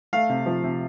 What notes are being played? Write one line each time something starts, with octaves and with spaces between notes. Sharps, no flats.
A3 F5
C3
F3
C3